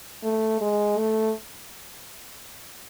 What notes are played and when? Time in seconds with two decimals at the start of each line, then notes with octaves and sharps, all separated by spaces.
0.23 A3
0.61 G#3
0.97 A3